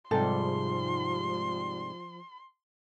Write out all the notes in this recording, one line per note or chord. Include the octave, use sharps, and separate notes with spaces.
G#2 C3 F3 G3 A4 C6